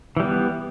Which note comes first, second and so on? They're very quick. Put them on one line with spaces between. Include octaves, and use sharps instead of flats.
E3 G3 B3